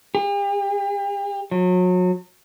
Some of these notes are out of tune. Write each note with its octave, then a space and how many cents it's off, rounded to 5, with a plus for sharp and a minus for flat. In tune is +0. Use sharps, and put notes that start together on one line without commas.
G4 +45
F#3 -30